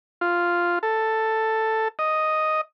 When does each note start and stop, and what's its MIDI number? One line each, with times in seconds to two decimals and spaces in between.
0.21 0.79 65
0.83 1.88 69
1.99 2.61 75